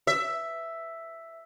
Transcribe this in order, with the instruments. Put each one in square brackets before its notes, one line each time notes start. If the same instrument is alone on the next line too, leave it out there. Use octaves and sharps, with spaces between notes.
[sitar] E5